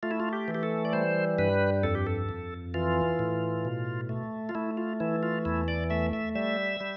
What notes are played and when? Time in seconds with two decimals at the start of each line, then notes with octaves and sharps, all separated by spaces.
0.03 A3 F4
0.11 E4
0.20 F4
0.33 G4
0.48 E3
0.55 G4
0.63 A4
0.85 D5
0.93 G3 C5
1.38 G2 B4
1.83 F2 A4
1.95 G4
2.07 A4
2.29 F2
2.74 E3 F4
3.19 A2
3.65 B2
4.09 A3
4.49 F4
4.55 A3 E4
4.77 F4
5.00 E3 E4
5.23 F4
5.45 E2 E4
5.68 D5
5.90 A3 E5
6.13 E5
6.35 G3 E5
6.81 G3